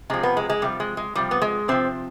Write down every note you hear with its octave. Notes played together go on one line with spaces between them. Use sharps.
C3 F3 G#3
B3
G#3
G#3
C3 F3 G3
G#3
G#3
C3 F3 G3
B3
G#3
C3 F3 C4